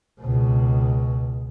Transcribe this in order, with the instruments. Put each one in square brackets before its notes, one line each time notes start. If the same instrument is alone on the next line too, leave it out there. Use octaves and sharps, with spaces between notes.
[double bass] C#2 B2